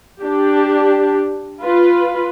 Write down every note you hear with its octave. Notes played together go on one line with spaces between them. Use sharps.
D4 G4
F4 B4